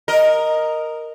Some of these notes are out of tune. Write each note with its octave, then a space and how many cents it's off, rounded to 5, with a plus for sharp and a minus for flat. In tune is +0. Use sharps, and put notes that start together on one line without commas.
A#4 +0 D#5 -5